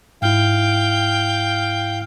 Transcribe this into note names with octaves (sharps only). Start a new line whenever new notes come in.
G#2 E4 F5 G5